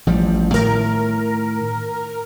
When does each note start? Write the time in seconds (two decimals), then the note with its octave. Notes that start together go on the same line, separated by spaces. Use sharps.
0.07 A1 F3 G3
0.54 A2 D#3 A#4